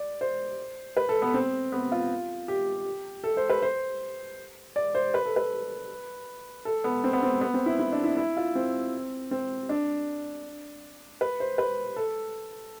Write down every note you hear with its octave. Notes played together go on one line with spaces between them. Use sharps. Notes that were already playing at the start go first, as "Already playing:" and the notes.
Already playing: D5
C5
B4
A4
B3
C4
B3
F4
G4
A4
C5
B4
C5
D5
C5
B4
A4
B4
A4
B3
C4
B3
C4
B3
C4
E4
E4
D4
E4
E4
F4
C4
C4
D4
B4
C5
B4
A4